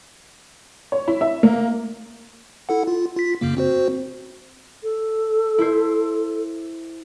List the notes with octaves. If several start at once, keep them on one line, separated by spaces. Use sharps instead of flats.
C#5
E4
E5
A#3
E4 A4 F#5
F4
F4 B6
F#2 C#3 A#3
C4 F#4 C5
A4
E4 C5